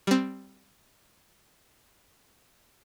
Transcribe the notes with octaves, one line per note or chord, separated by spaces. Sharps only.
G3 C4